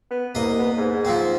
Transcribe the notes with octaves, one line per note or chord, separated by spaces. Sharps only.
B3
C2 A#3 D#5
B3
G#2
F3 C4